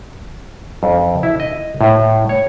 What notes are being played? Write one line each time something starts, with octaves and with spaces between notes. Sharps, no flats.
F2
E4
D#5
A2
C#5